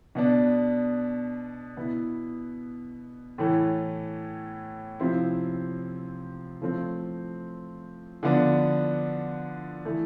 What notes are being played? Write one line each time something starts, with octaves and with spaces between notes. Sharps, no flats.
B2 B3 D4
B2 B3 E4
A2 E3 A3
C3 F3 C4 E4
F3 A3 C4
D3 F3 B3 D4
E3 A3 E4